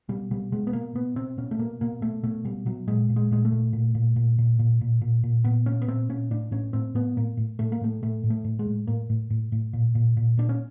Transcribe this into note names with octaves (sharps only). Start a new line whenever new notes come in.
B2 G3
B2 G3
B2 G#3
B3
B2 A#3
B2 B3
B2 C4
B2 C#4
A3
B2 A#3
B2 A#3
B2 A3
B2 A3
B2 G3
B2 F#3
A#2 G#3
A#2
G#3
A#2 G#3
A3
A#2
A#2
A#2
A#2
A#2
A#2
A#2
A#2
A#2
A#2 B3
A#2 C#4
B3
A#2 C4
A#2 C#4
A2 D4
A2 C#4
A2 C4
A2 B3
A2 A#3
A2
A2 A3
A#3
A2 A3
A2 A3
A2
A3
A2
G#3
A2
A2 A#3
A2
A2
A2
A#2
A#2
A#2
A#2 D4
C#4